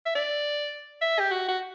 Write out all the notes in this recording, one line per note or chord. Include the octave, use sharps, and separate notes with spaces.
E5
D5
E5
G4
F#4
F#4